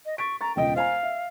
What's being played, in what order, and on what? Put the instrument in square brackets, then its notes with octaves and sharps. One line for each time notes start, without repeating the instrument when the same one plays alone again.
[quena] D#5
[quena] C#6 [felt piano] A6 B6 D7
[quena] A#5 [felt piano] C#6 A6
[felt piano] E1 C#2 D#5 [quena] G5
[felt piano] C5 G#5 A#5 [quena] F5
[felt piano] E5